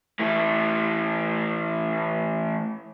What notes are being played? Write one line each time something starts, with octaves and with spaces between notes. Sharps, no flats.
E3 A3